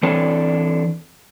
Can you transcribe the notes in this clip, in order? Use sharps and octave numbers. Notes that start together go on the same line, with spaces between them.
E3 C4 D4 A4 B4 C#5